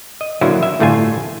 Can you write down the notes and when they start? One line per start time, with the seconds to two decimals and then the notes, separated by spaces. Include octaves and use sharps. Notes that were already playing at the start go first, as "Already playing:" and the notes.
0.21 D#5
0.41 D3 F#3 A#3 E4 C5
0.63 E5
0.80 G1 A2 D3 A3 F4 G#5